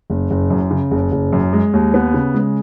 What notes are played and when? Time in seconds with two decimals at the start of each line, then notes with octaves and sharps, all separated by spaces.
0.10 F#1
0.30 F#1
0.50 F#2
0.71 C#3
0.91 F#1
1.12 F#1
1.33 F#2
1.53 G#3
1.73 D#2
1.94 B3
2.14 C#3
2.34 G#3